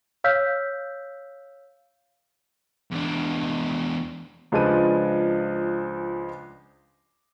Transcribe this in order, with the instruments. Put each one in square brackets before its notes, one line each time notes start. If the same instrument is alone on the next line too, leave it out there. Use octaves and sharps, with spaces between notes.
[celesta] C#5 F5 E6 F6 G6 B6
[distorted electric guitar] E2 D4
[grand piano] C#2 F3 G#3 D4 B4 D#7